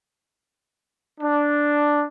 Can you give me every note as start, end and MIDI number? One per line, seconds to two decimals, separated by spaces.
1.20 2.05 62